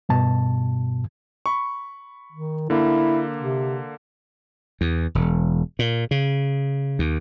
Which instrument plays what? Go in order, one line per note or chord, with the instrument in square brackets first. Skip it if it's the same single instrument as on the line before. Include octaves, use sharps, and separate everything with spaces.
[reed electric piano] G2 B2 A5
[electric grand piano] B5 C#6
[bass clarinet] D#3
[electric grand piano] D3 A#3 [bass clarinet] E4
[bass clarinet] C3
[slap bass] E2
E1
A#2
C#3
D#2